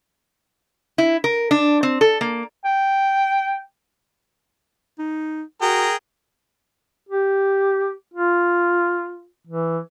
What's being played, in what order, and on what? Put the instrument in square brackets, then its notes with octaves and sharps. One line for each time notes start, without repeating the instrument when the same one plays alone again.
[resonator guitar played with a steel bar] E4
A#4
D4
C4
A4
A#3
[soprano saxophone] G5
[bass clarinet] D#4
[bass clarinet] F#4 [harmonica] G#4 A#4 G5
[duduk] G4
F4
E3